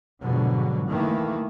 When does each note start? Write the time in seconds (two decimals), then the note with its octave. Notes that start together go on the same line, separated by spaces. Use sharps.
0.21 F2 G#2 B2 D3 F#3
0.88 D#3 E3 A3 A#3